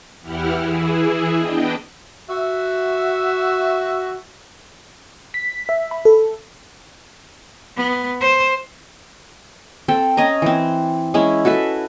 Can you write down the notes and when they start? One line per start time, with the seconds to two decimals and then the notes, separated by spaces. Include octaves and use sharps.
0.21 E2 E3 E4 G4 F#5 F6
0.60 E3 E4 G#4
1.37 B3 D4 D#5 G5
2.30 F#4 E5
5.34 B6
5.69 E5
5.91 B5
6.05 A4
7.77 B3
8.21 C5
9.88 C4 A4 G5
10.17 C#4 D#5 G#5 A#5
10.42 E3 C4
11.14 G#3 C#4 E4
11.45 F#4 A4 B4 E5